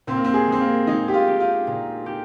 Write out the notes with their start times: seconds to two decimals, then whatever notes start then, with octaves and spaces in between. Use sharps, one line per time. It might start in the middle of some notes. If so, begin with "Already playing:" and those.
0.07 A#2 C4
0.16 A#3
0.24 C4
0.34 G#4
0.47 G#3 C4
0.61 A#3
0.87 G#3 D#4
1.08 G4
1.14 F4
1.27 G4
1.40 F4
1.67 A#2
2.06 G4